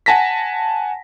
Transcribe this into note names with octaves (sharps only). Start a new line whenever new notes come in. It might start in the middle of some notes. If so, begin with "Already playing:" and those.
F#5 G#5 A5 A#6 B6